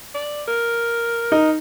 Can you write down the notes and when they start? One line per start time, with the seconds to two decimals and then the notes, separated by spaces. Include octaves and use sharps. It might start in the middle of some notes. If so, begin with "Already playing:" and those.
0.15 D5
0.48 A#4
1.32 D#4